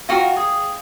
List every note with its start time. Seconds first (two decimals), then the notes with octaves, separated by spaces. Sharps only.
0.09 F4 F#4 A#4 F5 G5
0.36 G#4